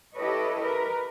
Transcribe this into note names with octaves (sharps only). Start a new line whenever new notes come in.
E4 G4 A4 B4 C#5 D#5
A#4 B4